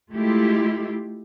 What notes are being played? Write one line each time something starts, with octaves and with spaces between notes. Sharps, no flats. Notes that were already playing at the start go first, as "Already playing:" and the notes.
G#3 A3 E4 F4 G4